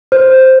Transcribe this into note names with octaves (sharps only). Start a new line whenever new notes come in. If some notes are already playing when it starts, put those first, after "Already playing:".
C5